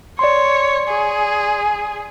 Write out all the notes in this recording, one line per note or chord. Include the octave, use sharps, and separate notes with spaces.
C#5 D5 C6
G#4